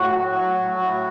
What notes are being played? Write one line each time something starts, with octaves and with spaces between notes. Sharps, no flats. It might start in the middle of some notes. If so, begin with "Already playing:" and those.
Already playing: A2 F#4
F#3
F#3
A2
A2